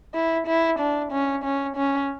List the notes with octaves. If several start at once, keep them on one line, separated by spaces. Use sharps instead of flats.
E4
E4
D4
C#4
C#4
C#4